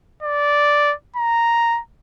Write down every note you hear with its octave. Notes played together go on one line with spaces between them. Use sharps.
D5
A#5